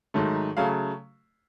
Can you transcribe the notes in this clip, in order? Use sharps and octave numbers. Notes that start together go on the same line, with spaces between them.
G#2 D#3 F#3 A3
C#3 F#3 A3 F5